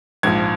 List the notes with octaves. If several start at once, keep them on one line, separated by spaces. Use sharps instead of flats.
A#1 G#2 F3 G#6